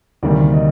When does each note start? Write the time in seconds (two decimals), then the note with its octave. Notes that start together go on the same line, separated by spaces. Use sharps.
0.23 D2 C3 D#3 G3 A#3 D5
0.54 D#5